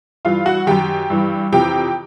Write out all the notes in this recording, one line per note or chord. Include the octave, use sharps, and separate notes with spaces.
G2 E3 F4 F5
F#4 F#5
F#2 D#3 G4 G5
G2 E3
F2 C3 E3 G4 G5